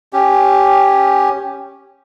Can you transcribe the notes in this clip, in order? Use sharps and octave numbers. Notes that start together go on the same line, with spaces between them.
C#4 G4